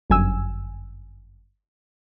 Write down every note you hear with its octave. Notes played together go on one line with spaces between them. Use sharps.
G1 F#2 G#5 E6